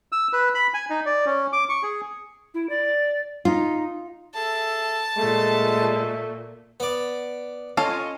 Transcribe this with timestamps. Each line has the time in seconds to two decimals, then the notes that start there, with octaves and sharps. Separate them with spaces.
0.12 E6
0.33 B4
0.54 B5
0.74 G#5
0.90 D#4
1.06 D5
1.26 C#4
1.53 D6
1.69 C#6
1.83 G#4
2.54 E4
2.70 D5
3.45 D#4 F4
4.34 G#4 A4 E5 A5
5.17 A#2 G#3 A3
6.80 B3 D5
7.77 C#4 F4 A4 C#5 D#5 F5